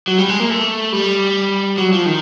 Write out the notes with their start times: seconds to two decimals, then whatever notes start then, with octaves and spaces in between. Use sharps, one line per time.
0.08 F#3
0.18 G3
0.29 G#3
0.40 A#3
0.50 A3
0.92 G3
1.78 F#3
1.92 F3
2.06 D#3